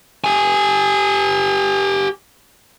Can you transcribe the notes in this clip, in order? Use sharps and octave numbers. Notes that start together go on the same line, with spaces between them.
G4 G#5